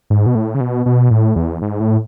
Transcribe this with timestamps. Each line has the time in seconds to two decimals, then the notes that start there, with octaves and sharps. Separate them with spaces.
0.10 G#2
0.26 B2
0.35 A2
0.55 C#3
0.60 B2
0.86 B2
1.11 A2
1.36 E2
1.62 G#2
1.80 A2